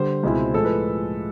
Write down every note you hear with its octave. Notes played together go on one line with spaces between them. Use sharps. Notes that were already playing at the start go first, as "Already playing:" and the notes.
Already playing: D3 G3 C5
C#2 B2 G#3 C4 E4
A2 F3 G#3 A4
B4